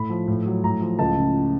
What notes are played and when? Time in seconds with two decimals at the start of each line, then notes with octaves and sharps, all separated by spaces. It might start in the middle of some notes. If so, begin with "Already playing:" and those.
Already playing: A2 B5
0.10 F3
0.28 A2
0.46 F#3
0.64 A2 A#5
0.81 F3
0.99 C#2 A5
1.18 C#3